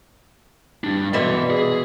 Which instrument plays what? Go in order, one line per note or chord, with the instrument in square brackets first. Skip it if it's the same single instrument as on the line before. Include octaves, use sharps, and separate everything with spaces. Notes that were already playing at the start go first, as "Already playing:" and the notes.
[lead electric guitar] G3 D4
[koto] B2 E3 E5 [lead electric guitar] D5 C6
[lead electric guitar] G#4